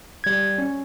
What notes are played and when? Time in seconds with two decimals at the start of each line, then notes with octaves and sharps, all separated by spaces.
0.24 G3 G#6
0.58 C#4